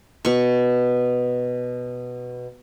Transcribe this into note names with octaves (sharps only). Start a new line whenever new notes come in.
B2 C#6